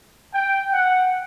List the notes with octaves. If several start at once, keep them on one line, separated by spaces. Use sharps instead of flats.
G5
F#5